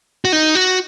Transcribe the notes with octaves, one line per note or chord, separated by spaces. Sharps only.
F#4
D#4
F#4